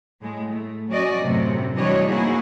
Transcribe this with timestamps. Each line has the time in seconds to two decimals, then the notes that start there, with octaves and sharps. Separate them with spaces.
0.21 A2 G#3
0.50 A3
0.89 F#3 C#4 F#4 D5 D#5
1.19 F#2 A2 C3
1.75 E3 G3 D4 F#4 C#5 D#5
2.09 F3 A#3 D#4 E4 F#4 G#4